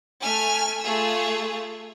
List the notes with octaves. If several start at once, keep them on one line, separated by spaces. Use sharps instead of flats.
A3 G#5 F6
A3 F4 G#4 E6